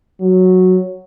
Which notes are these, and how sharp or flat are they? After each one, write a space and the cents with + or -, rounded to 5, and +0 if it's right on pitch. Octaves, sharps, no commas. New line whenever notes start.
F#3 -5